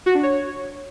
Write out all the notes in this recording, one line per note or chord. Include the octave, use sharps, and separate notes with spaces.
F#4
D4
C#5